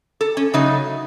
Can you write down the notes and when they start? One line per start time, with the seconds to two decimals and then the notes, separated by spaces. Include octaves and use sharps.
0.21 A4
0.37 C#4
0.54 C#3 F#3 A3 D#4